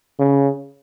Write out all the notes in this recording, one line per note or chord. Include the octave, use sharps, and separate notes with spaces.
C#3